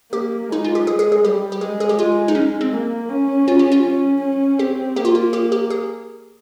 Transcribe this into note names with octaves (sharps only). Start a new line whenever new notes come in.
A#3 G4
G#3 D#4
F4
G4
G#3 G#4
G#4
G#4
G3 G4
G4
G#3 G#4
G#4
G4
G#3 F4
D#4
G#3 C#4
C4
A#3
C#4
F4
G4
F4
C#4
C#4
C4 G4
A#3 G4
F4
F4
G4
G4
G#4